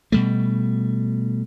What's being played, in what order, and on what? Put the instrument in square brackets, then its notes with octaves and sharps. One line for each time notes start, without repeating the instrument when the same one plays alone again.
[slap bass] B2 G3 A3